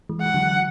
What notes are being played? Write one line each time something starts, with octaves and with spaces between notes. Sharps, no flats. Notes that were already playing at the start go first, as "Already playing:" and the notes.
E3 G#3
E3 F#5
D3 F#3